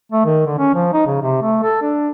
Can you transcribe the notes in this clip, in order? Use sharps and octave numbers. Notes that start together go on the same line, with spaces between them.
A3
D#3
D3
C#4
F3
D#4
C#3
C3
A3
A4
D4